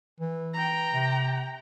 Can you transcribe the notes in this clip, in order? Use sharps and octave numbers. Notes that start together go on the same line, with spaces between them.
E3
G5 A#5
C3